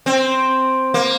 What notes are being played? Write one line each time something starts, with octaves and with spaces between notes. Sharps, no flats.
C4
A#3